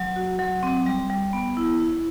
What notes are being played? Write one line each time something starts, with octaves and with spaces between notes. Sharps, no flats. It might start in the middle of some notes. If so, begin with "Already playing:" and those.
Already playing: F#3
F#4
F#3
C4
G3
G3
B3
E4
E4